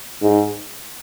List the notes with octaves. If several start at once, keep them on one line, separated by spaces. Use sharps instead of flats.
G#2